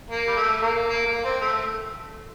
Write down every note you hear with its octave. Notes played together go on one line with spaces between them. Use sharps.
A#3
G3
A3
A#3
A#3
A#3
C4
A3